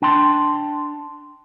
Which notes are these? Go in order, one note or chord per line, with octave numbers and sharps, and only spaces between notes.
D4 G5 A5 C6